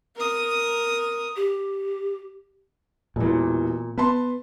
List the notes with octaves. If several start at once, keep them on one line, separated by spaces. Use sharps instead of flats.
A#4 D#6
G4
E1 A#2 E3
B3 B4 A5 C6